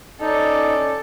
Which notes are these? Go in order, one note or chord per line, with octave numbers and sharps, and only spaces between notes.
C#4 D#4 A4 D5